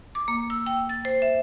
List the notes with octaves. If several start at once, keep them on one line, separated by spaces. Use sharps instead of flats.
D6
A#3
E6
G5
A6
C5
E5